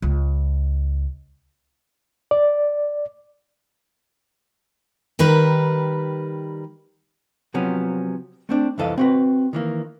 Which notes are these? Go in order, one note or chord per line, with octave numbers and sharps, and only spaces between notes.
C#2
D5
D#3 G3 A#4 B4
C3 F3 F#3 B3 C#4
A3 C4 D4
C2 F2 E3 A4 D#5 F5
C4 F#4 B4
D#3 E3 A#3